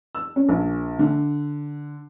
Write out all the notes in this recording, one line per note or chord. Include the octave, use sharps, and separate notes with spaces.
E6
C#4
A#1
D3